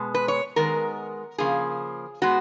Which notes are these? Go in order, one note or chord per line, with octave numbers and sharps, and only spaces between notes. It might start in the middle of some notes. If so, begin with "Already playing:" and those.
Already playing: B2 G#3 B3
B4
C#5
D#3 G#3 B3 A#4
C#3 F3 A#3 G#4
G#3 B3 F#4